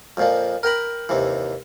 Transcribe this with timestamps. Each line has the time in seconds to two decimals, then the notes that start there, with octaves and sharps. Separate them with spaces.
0.17 F2 A#2 F3
0.63 A#4 G5 A#5 B5
1.09 D#2 C3 E3